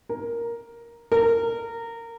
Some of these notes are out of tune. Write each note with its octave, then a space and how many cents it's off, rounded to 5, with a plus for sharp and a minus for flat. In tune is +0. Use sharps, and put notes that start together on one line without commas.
A#4 +5
A#4 -20